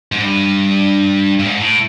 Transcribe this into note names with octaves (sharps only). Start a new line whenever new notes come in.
G#2
G2
G2
G#2
A2